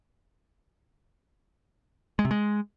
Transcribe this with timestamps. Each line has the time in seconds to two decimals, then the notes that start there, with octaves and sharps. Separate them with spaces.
2.19 G#3
2.25 C3
2.31 G#3